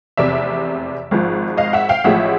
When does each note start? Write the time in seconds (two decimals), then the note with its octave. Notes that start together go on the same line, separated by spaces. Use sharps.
0.17 F1 E2 C3 D5 E5
1.11 G#1 G#2 F3
1.57 D#5 F5
1.73 E5 F#5
1.89 F5 G5
2.04 A1 A2 F3 G#3 E5 F#5